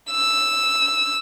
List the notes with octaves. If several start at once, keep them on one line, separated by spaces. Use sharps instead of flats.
E6